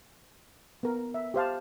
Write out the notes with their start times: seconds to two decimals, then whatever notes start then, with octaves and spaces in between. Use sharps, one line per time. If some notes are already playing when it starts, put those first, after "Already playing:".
0.83 B3 A#4
1.14 E5
1.34 G4 C5 F5 A5